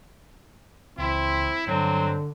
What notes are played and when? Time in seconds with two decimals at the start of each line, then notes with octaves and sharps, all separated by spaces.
0.98 C#2 E3 C4 E4
1.67 G2 D3 F#3 C4